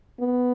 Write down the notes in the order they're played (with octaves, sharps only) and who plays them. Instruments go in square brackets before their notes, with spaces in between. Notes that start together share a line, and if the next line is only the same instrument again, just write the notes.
[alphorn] B3